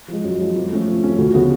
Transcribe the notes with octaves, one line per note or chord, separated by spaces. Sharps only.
F3 G#3
F#2
F3 G#3
F2
F3 A3 C#4
F2
F3 A3 C#4
D2
C#3 F3 B3 F#4